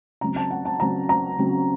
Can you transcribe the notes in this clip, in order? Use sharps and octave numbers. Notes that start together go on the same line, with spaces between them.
C#3 F#3 C4 A#5
A5
F#5
A5
C#3 F#3 C4 A#5
A#5
C#3 F#3 C4